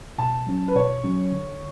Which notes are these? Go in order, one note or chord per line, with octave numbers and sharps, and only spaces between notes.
B2 A5
F#3 C#4
B4
B2 C#5
F#3 C#4
D3